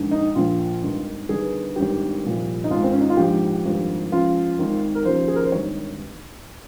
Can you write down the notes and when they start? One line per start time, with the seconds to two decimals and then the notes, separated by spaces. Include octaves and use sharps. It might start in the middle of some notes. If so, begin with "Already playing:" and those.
Already playing: A#1 G#2 D#3
0.11 D#4
0.35 A#1 A#2 F3 F4
0.83 G#1 G2 D#3
1.29 G1 G2 D#3 G#4
1.76 G#1 G2 D#3 G4
2.24 C2 A#2 F3
2.64 D#4
2.70 G#1 G#2 D#3 F4
2.84 C4
2.92 C#4
3.00 D#4
3.10 F4
3.17 A#1 G#2 F3 G4
3.65 G#1 G2 F3
4.11 C#2 C#3 F3 F4
4.59 G#1 G#2 D#3
4.95 A#4
5.05 F1 D#2 C#3 F3 C5
5.28 G#4
5.36 A#4
5.44 C5
5.52 G#1 G2 D#3 C#5